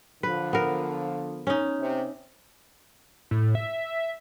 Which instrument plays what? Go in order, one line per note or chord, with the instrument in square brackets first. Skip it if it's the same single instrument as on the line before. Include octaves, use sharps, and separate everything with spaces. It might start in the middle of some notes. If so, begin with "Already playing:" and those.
[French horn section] D3 F3 [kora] B4
[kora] B3 A#4
C#4 D#4
[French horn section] C3
[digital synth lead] A2
E5